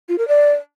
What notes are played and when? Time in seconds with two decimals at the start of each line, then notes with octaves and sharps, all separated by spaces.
0.09 F4
0.18 A#4
0.28 D5